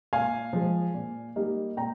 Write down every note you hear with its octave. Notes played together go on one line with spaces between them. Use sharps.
A#2 F5 G#5
F3 G#3
A#2
G3 A#3 D#4
A#2 G5 A#5